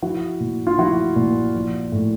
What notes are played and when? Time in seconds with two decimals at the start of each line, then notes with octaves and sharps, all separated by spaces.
0.02 F3 E4 F#4
0.40 A#2
0.67 F4
0.78 F3 E4 F#4
1.16 A#2
1.55 F3
1.92 A2